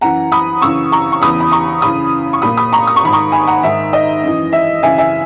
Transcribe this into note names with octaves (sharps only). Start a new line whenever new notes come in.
F#2 E3 F#5 A#5
B5 D#6
F#2 C#3 E3 C#6 E6
A#5 C#6
C#6
E2 C#3 E3 B5 D#6
B5
A#5 C#6
F#2 C#3 E3 B5 D#6
C#6
A#2 B5 D#6
B5 D#6
A#5 C#6
D#6
C#6
G#2 D#3 B5
A#5 C#6
G#5 B5
F#5 A#5
G#2 D#3 E5
D#5
F#2 E3
E5
F#2 C#3 E3 E5 G#5
E5 G#5